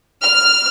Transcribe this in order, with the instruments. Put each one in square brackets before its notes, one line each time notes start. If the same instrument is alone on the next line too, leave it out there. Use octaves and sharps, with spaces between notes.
[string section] F6